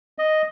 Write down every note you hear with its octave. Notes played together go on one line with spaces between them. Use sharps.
D#5